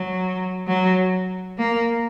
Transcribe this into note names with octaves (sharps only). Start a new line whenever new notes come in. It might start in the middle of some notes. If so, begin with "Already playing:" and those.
Already playing: F#3
F#3
A#3